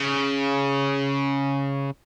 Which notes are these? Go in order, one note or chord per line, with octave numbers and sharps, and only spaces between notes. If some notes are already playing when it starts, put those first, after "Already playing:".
Already playing: C#3